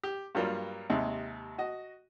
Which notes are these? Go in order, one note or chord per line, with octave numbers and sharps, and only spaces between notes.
G4
G2 F#3 G3 A#3 F4
D#2 C3 G#3
F#4 D#5